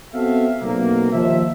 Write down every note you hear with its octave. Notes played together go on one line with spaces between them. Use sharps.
B3 C4 F#4 A4 E5 F5
B1 C3 F#3 A#3
D#2 F3 E5